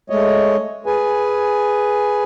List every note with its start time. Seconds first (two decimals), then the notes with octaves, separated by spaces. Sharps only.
0.10 G#3 A3 C#5 D#5
0.86 G#4 B4 G#5